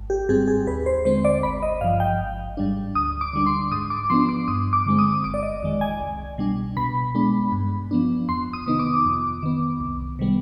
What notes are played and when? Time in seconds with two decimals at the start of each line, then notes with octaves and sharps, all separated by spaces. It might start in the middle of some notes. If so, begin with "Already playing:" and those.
Already playing: G#1
0.10 G4
0.29 G#2 G3 C4 G#4
0.48 G#4
0.67 D#2 B4
0.86 C5
1.05 D3 G#3 C4 C5
1.25 D5
1.43 G#1 B5
1.63 D#5
1.81 G2 F3 F5
2.00 G5
2.20 G#1
2.57 G#2 G3 D4
2.95 D2 D#6
3.21 D6
3.33 D3 G3 D4
3.46 C6
3.72 G#2 D#6
3.90 D6
4.10 F3 B3 D4 C6
4.29 D6
4.48 G2 D#6
4.73 D6
4.86 D3 G#3 C4
4.99 D#6
5.24 G1 D6
5.34 D5
5.43 D#5
5.63 F2 D#3 G#3
5.81 G#5
6.00 C2
6.38 B2 G3 D4
6.77 B2 B5
7.15 G#3 B3 D4
7.52 G2
7.91 F3 B3 D4
8.29 F2 C6
8.53 D#6
8.66 C3 D#3 B3 D#4
8.79 D6
9.05 F2
9.43 D#3 B3
9.80 C2
10.19 C3 D#3 G3 B3